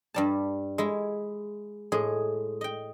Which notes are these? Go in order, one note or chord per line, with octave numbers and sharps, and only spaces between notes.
G2 G3 A5
G#3 E4
A2 G#3 G#4
D#5 G5